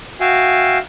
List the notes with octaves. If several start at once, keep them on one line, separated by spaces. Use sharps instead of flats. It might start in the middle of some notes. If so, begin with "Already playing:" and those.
F#4 E5 F5 G5 G#5